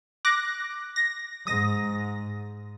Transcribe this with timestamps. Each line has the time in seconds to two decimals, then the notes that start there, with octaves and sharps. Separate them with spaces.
0.25 D6 F#6 A#6
0.96 A#6
1.47 G#2 D#6 A#6